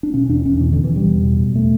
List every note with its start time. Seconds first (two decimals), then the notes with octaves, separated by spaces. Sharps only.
0.03 D4
0.14 B2 C#4
0.29 E2 D4
0.45 E2 C#4
0.60 B2 E3
0.73 B2 D3
0.84 E3
0.92 E2 G3
1.07 E2
1.23 B2
1.39 B2
1.56 A3